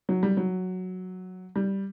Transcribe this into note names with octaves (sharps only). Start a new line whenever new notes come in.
F#3
G3
F#3
G3